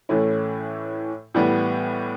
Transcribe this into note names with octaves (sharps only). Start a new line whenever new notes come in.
A2 E3 A3 C#4 E4
A2 E3 G3 B3